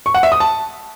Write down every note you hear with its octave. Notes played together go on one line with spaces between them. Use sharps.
C#6
F#5
E5
D#6
A5